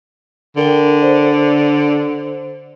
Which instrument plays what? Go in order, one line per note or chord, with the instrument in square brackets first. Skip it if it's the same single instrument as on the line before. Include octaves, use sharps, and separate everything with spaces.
[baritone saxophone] D3 [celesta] A#4 G5 G7
[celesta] C5 D5